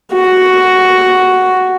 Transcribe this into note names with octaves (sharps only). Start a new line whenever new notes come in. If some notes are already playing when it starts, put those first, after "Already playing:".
F#4